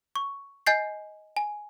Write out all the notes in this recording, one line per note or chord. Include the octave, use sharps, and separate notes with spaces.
C#6
D#5 G#5 G6 A6 C7
G#5